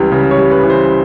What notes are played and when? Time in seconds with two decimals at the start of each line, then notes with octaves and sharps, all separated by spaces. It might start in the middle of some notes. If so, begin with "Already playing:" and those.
Already playing: C#2 E3 G3
0.12 C#3
0.31 C#5
0.37 G3
0.51 B4
0.63 E3
0.70 C5